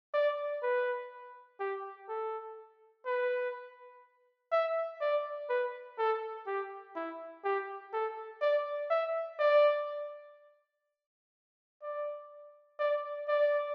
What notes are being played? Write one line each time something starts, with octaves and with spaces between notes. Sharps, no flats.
D5
B4
G4
A4
B4
E5
D5
B4
A4
G4
E4
G4
A4
D5
E5
D5
D5
D5
D5